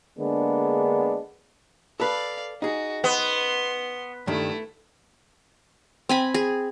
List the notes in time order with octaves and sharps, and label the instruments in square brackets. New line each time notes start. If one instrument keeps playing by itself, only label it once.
[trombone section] D3 G#3 A#3 B3 D4 G#4
[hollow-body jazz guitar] A4 B4 [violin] D5 F5
[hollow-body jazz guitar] D#4 G#4 [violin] F#4
[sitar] B3 [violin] C6
[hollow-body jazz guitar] G2 D#3 [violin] A3 E4
[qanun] C4 G#5 B5
G#4